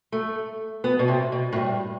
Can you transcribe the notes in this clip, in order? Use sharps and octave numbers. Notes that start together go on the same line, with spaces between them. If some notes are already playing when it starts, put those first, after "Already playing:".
A3
B3
B2
C3
B2
A2
G2